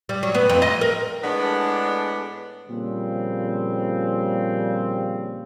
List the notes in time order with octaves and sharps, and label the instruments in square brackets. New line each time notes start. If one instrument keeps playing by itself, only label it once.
[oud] G3
F#3
B3
F2
D#5
A#4
[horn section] A2 G#3 B3 D4
[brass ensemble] A#2 C#3 F3 G3 C4